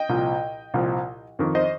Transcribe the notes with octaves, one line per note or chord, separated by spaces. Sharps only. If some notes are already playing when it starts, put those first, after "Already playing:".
Already playing: D#5 G5
C2 A#2 F3
C2 A#2 F3
F2 D#3
C5 D#5